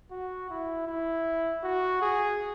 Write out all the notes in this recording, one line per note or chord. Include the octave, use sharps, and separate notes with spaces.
F#4
E4
E4
F#4
G#4